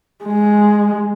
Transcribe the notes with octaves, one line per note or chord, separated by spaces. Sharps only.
G#3